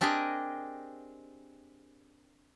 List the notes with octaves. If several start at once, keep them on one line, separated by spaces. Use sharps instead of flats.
C4 D4 G4 G#4 A#4 D#5